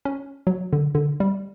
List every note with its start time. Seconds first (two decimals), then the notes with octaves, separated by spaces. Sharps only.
0.05 C#4
0.47 F#3
0.73 D3
0.95 D3
1.20 G3